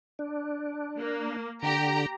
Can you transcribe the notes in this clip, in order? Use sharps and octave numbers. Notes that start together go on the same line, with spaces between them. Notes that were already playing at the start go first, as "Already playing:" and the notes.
D4
A#3
D3 G4 A#5